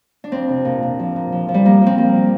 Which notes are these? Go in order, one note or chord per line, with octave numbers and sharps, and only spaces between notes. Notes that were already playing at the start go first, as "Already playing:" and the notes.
D4
F2 C4
C3
A#2
A#2
F3
A#2
F3
F3
G3
F3 A#3
F3
C4
F3 A#3
A#2